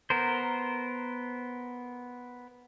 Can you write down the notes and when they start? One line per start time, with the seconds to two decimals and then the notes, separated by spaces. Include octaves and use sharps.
0.10 B3 A#4 C5